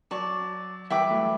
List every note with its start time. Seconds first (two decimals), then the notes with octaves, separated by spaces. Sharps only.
0.11 F#3 D5 A5 C#6
0.90 E3 G3 B4 E5 G5 D6
1.10 F#3 A3